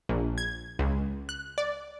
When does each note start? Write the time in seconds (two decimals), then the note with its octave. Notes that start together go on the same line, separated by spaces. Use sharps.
0.09 A#1
0.38 G#6
0.79 C#2
1.29 F#6
1.58 D5